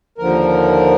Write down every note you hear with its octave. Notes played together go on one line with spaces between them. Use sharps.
D#2 D3 F3 A#4